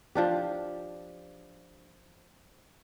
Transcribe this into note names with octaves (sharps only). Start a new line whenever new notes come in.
F3 D4 G4